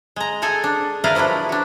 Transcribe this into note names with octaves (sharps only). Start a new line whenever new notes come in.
G#3 A#5
G#4 A4 G5 G#5
D4
E4 A#4 B4 D5 D#5 F5
F3 F#3 D4 E4 B4
D4 F#4